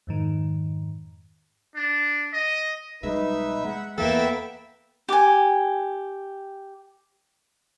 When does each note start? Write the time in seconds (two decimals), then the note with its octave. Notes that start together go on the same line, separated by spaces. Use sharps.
0.07 F2 G#2 D#3
1.76 D4
2.34 D#5
3.03 B1 G3 G#3 D#4 B4 E5
3.65 G#3 F#5
3.98 E2 E3 A#3 B3 A4 B4 E5 G5
5.09 G4 G#5